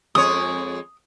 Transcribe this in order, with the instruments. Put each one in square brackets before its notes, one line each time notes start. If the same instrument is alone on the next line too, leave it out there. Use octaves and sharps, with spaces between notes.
[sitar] F2 G#3 C#5 [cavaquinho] D#6